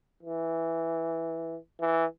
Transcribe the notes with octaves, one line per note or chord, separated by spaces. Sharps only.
E3
E3